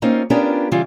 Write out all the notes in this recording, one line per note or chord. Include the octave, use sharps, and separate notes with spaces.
A#3 C4 C#4 D#4 F4
B3 C#4 D4 F4 G4 A#4
C#3 E3 G3 F4